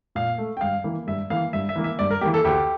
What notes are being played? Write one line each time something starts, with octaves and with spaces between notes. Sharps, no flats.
A#2 F5
A3
G5
G2 F5
E3 A#3
G2 E5
E3 A#3 F5
G2 E5
E5
E3 A#3
E5
G2 D5
A#4
E3 A#3 G4
A4
D2 G4